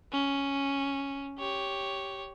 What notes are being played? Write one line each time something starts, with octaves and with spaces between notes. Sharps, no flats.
C#4
G4 C#5